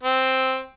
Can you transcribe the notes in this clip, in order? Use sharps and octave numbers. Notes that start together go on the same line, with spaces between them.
C4